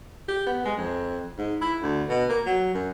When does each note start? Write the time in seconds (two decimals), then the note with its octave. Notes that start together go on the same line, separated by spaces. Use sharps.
0.29 G4
0.47 B3
0.65 G#3
0.78 F2
1.38 G#2
1.61 E4
1.82 D2
2.09 B2
2.29 A#3
2.46 F#3
2.74 F#2